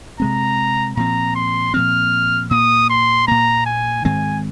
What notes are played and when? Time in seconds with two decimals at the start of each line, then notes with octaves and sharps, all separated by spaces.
0.20 C3 G#3 C4 A#5
0.97 A#2 F3 C4 A#5
1.35 C6
1.74 A#2 F3 C4 F6
2.51 A#2 A#3 D#6
2.90 C6
3.27 A#2 A#3 A#5
3.66 G#5
4.05 G#2 D#3 G#3 C4 G#5